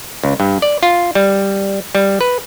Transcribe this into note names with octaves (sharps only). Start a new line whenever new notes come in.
C#2
G2
D5
F4
G3
G3
B4